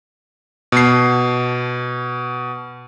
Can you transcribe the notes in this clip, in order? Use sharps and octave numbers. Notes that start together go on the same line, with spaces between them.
B2 C7